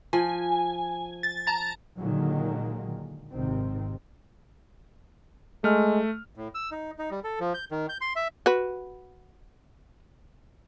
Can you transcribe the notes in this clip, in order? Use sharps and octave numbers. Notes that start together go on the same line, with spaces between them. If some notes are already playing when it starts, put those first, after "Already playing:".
F3 G#5
A6
A5 A#5 A6
A#2 D3 D#3 F#3 G#3 A#3
G#1 C3 D#3 C4
G#3 A3 F6
A2
E6
D#4
D#4
G3
A4
F3
G6
D#3
G6
C6
E5
F#4 B4